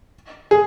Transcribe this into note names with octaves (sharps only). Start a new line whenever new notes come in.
G#4